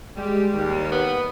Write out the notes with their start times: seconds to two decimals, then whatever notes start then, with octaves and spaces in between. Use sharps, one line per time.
0.17 G3 G#3 G4
0.51 D#2
0.92 B3